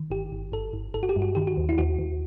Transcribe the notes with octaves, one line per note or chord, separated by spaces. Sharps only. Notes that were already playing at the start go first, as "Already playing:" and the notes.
Already playing: D#3
G1 G4
G1
G1 A4
G1
G1 A4
F#4
G4
G2
F#4
D#3 G4
F#4
D#2
E4
D#2 F#4
D#2